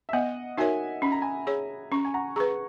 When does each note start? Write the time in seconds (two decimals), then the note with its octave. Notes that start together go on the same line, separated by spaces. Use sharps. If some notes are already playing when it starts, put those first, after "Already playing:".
0.09 E5
0.13 B3 D#5 F#5
0.58 D#4 F#4 A#4 C#5 E5 G#5
1.02 C#4 B5
1.12 A#5
1.22 G#5 B5
1.47 G#4 C#5
1.92 C#4 A#5 C#6
2.05 G#5
2.14 F#5 A#5
2.36 G#4 B4 A#5 C#6